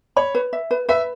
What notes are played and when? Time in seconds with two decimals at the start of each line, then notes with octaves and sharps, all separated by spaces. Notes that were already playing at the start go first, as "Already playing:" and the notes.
0.16 C#5 B5
0.35 B4
0.53 E5
0.71 B4
0.89 B4 E5